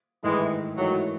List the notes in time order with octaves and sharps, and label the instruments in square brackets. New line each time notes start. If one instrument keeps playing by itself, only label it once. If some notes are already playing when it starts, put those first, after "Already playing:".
[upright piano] G#2 D#3 A3 E4 [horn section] E3 G#3
[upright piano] G#2 E3 A3 [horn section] D#3 F#3